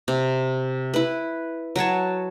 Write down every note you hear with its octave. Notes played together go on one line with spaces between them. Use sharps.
C3
E4 B4
F#3 F#4 C#5 A5